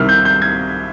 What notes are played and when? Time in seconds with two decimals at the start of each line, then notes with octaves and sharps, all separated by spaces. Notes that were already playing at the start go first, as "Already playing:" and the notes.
Already playing: C2 C3 D#3 F6
0.09 G6
0.25 G6
0.42 G#6